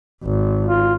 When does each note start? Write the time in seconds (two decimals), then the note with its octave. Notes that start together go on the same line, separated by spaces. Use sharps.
0.23 G#1
0.66 F4